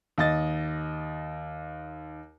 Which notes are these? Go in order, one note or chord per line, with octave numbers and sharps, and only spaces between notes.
D#2 D#5 A6